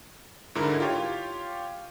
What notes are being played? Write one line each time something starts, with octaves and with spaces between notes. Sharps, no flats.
G#2 D3 E4 A#4
F4 G4 C#5